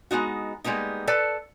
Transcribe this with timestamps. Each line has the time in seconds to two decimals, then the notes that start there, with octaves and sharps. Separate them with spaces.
0.11 G#3 B3 D#4 F#4
0.64 G3 G#3 A#3 B3 D#4
1.07 A4 B4 D5 A5